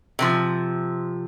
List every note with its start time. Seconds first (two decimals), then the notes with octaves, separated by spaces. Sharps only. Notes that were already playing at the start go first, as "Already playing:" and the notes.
0.19 C3 E3 F3